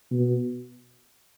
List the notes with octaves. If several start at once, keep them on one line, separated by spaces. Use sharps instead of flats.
B2